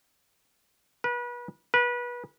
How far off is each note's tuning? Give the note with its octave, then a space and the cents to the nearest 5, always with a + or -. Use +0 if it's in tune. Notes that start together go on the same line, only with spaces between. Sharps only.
B4 -30
B4 -25